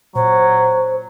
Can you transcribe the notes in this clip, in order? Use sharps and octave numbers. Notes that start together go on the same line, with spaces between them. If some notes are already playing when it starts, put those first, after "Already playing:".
A#2 F#3 C5